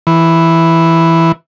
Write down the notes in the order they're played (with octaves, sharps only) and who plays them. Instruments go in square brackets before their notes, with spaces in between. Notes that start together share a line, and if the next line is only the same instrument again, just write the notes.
[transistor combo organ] E3